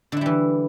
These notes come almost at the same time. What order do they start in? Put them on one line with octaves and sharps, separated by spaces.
D3 E4 G3 E3